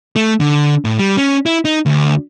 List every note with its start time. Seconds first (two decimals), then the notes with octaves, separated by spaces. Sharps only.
0.16 A3
0.40 D3
0.85 A2
0.99 G3
1.17 C#4
1.46 E4
1.65 D#4
1.86 D2